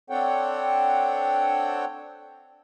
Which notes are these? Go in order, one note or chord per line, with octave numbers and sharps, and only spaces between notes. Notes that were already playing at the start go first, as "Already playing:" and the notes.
C4 D4 A4 C#5 F#5 G5